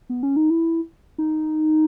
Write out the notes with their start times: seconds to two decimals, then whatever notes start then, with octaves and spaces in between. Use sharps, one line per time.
0.09 B3
0.23 C#4
0.36 D#4
0.50 E4
1.18 D#4